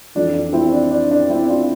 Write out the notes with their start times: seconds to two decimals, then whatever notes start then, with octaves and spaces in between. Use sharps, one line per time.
0.15 F2 E3 D4
0.34 D4
0.53 C4 E4
0.72 D4
0.91 D4
1.11 D4
1.30 C4 E4
1.49 D4 F4